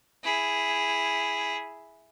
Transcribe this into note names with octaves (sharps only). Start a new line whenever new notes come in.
E4 G#4